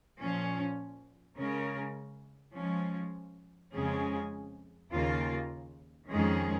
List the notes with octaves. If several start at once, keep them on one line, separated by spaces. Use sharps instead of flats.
A#2 F3 C#4
C#3 G#3 C#4 A#4
F3 G#3 C#4
F2 C#3 G#3 C#4 G#4
D#2 C#3 A#3 F4 A#4
F2 D#3 G#3 C#4 G#4